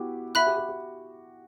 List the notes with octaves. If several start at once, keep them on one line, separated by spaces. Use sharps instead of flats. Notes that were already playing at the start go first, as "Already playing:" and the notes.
Already playing: B3 E4 F#4 G4
F#4 E5 B5 F#6
G4
G4
G4